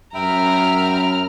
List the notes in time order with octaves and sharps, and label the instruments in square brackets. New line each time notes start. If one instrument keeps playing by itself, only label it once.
[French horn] F#2 [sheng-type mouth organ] E5 G5 B5 [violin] A#5 F6